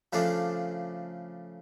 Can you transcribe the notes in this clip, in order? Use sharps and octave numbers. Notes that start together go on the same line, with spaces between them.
C#3 F3 A3 D4